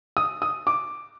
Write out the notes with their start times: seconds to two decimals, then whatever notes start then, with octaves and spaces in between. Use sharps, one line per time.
0.17 D#6
0.42 D#6
0.67 D6